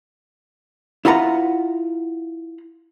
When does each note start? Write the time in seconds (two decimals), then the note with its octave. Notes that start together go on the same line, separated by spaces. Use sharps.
1.05 E4 F4 B4 F#5 A#5